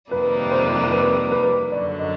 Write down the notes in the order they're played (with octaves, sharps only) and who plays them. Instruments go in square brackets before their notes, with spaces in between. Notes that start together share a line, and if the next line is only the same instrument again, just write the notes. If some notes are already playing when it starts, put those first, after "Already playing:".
[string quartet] F2 C3 D#3 G3 A#3 [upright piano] B4
[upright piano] C5
B4
B4
[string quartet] F#2 D3 F#3 [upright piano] D5
[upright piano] D#5